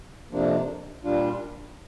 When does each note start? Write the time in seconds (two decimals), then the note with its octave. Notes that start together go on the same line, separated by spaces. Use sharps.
0.31 F2 C3 F3 A#3 D4
1.04 A#2 G3 D4 F4